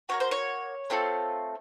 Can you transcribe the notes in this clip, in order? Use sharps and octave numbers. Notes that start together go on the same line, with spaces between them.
A#3 C#4 F#4 C#5
C5
C#5
A3 C4 F4 A4